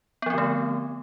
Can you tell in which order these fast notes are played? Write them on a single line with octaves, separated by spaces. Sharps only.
B3 F3 C4 D3 A3